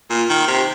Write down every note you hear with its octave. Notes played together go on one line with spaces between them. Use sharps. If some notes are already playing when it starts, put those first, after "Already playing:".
A#2
D#3
C3